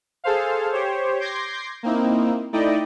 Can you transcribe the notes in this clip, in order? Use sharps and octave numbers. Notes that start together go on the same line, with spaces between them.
G#4 A4 C5 F5
G4 C5 C#5
C6 D6 G6 G#6 A#6 C7
A#3 C4 D#4 E4
A3 D#4 E4 D5 D#5 G5